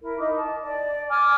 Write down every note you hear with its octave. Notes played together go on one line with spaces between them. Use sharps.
E4 A#4
D#4 D#5 D6
A5
D5
G#5 D6 F6